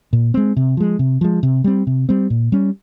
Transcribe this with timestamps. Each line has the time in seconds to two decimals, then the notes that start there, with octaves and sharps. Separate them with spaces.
0.13 A#2
0.34 G#3 C4
0.57 C3
0.77 F3 G#3
0.99 C3
1.21 F3 G#3
1.43 C3
1.64 G3 C4
1.87 C3
2.09 G3 C4
2.30 A#2
2.52 G3 C#4